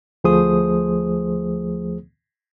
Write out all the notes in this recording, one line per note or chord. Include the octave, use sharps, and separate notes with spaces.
D2 F3 A3 G#4 C5 D#6